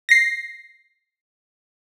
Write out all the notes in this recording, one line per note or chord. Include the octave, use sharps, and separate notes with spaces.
A#6 C7